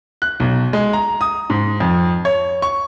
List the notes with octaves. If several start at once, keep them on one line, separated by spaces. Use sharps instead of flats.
F#6
B1
G#3
A#5
D#6
G#2
F2
C#5
C#6